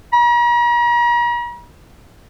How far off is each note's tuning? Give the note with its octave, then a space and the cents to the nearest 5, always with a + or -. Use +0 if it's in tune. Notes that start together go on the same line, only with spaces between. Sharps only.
A#5 +45